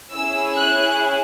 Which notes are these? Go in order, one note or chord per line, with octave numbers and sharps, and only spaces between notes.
C#4 E4 G#4 E6
F#6